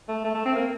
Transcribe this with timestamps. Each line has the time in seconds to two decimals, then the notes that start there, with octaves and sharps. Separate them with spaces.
0.08 A3
0.24 A3
0.34 A3
0.45 C4
0.55 A#3